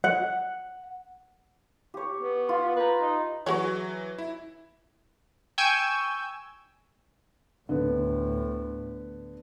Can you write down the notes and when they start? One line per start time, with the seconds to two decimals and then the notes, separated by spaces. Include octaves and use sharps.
0.04 F#5
1.94 G4 C#5
2.20 B3
2.48 F4 C6
2.76 B4 G5 A#5
3.00 D#4
3.46 E3 F#3 F#4 G#4 C#5
4.18 E4
5.58 G5 G#5 C#6 E6 G6 G#6
7.69 D2 A2 D3 B3